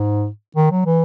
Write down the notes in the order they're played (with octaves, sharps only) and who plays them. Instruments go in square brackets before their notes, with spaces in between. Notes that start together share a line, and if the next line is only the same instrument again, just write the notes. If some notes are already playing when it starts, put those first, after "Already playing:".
Already playing: [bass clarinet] G#2
D#3
F#3
E3